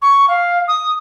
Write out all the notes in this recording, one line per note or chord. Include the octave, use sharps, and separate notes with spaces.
C#6
F5
D#6